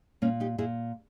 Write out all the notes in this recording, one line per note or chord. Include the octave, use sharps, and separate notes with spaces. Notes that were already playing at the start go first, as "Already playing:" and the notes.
A#2 A#3 C#4
D#4 G4
A#2 E4 G#4